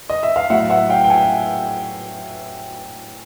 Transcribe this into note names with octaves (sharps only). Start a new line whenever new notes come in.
D#5
E5
F5
A2 F#3 A3 E5 F#5
E5 F#5
F5 G5
G5
F#5 G#5